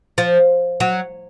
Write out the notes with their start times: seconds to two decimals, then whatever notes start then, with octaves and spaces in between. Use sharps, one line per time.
0.18 F3
0.80 F#3